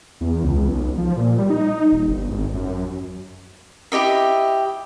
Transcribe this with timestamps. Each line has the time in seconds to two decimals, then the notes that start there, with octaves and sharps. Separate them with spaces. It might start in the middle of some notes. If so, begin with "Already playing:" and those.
0.21 E2
0.43 C#2
0.68 B1
0.98 F3
1.17 A#2
1.38 G3
1.50 D#4
1.92 D#1
2.08 G1
2.30 G#1
2.54 F#2
3.92 E4 G4 D#5 E5